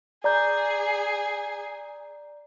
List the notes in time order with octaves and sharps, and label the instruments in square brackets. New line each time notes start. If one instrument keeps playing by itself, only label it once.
[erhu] G#4 [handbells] D5 A#5 G6